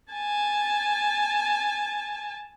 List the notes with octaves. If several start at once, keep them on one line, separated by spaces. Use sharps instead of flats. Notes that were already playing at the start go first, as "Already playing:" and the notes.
G#5 A5